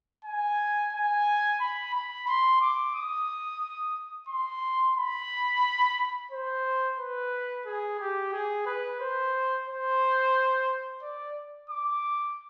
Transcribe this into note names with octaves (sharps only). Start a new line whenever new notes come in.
G#5
G#5
B5
B5
C6
D6
D#6
C6
B5
C5
B4
G#4
G4
G#4
B4
C5
C5
D5
D6